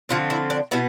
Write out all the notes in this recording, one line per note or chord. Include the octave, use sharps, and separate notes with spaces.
D3 F3 A3 C4 F4
E4
D4
B2 B3 E4